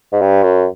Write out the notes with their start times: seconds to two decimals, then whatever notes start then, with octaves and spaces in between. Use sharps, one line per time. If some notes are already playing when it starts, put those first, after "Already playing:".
0.13 G#2
0.22 G2
0.43 F#2